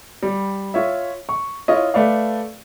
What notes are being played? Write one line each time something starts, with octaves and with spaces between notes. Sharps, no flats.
G3
F4 C#5 E5
C#6
E4 F4 C#5 D#5
A3 B4 D5 F5